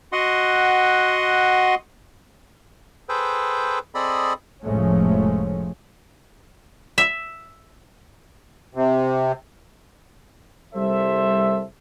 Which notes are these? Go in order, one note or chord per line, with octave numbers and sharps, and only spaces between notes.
F#4 D#5 F#5 C6
G#4 A4 B4 C5 G5
C4 G#4 A4 D5 D#5 B5
F1 A2 F3 G#3 A3 C#4
E5
C3
C2 G3 A4 C5 E5